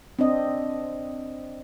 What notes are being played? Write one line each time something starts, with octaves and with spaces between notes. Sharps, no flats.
C4 D4 D#5